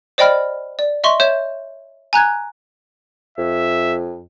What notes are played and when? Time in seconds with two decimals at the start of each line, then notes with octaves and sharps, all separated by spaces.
0.18 C5 D5 D#5 G5 B5 F6
0.79 D5
1.04 D#5 E5 C6 C#6
1.20 C#5 E5 G6 E7
2.13 G#5 A#5 F#6 G#6
3.38 F2 E5